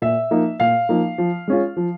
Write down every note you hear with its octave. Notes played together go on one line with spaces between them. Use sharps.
A#2 E5
F3 A#3 D#4
A#2 F5
F3 A#3 D#4
F3
G#3 C#4 F4
F3